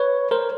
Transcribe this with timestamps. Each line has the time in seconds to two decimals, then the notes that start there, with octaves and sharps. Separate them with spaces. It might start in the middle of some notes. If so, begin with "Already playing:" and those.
Already playing: B4 C#5
0.31 A#4 C5